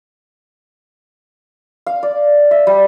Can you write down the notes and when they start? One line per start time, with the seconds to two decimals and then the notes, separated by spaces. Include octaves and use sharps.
1.86 F5
2.03 D5
2.51 E5
2.67 G3